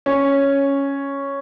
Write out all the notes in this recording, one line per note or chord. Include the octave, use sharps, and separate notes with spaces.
C#4